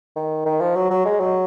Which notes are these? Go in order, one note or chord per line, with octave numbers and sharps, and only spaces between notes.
D#3
D#3
F3
F#3
F#3
G#3
F#3